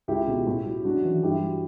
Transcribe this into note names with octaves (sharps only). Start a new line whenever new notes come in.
C#2 E4 G4
B2
A2
F#3
F#2 D4 F#4
E3
G2 E4 G4
F#3